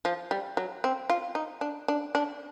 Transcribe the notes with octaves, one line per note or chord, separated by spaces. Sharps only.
F3
G3
F#3
C4
F4
D#4
D4
D4
D4